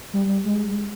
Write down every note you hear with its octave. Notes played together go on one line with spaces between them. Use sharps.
G3
G#3